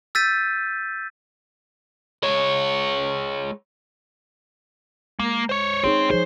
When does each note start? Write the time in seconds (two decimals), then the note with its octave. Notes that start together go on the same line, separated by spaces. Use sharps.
0.15 E6 G6 A6 B6 D#7
2.23 G#3 C#5
5.19 G#3 A#3
5.49 C5 C#5
5.84 C4 D#4 G#4 C#5
6.10 F3 G#4 C5